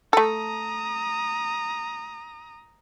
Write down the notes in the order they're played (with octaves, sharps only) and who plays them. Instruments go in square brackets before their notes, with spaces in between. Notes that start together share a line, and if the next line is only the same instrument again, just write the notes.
[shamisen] A3 A4 [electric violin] A#5 D#6